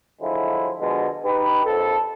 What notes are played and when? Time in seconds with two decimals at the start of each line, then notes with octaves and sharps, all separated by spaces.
0.21 D3 F3 F#3 G#3 E4
0.79 B2 D3 F3 G#3
1.24 D#4 G4 B4
1.65 A#1 F2 A4